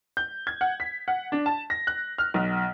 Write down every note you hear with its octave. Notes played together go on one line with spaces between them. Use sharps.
G6
G#6
F#5
B6
F#5
D4
A5
A#6
F#6
F6
B1